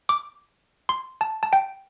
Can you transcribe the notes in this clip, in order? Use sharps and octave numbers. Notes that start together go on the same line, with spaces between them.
D6
C6
A5
A5
G5